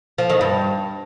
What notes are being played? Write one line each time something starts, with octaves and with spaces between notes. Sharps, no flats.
F3
D#3
G2